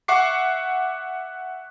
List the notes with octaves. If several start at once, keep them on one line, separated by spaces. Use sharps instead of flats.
E5 F#5 C#6 D6 C7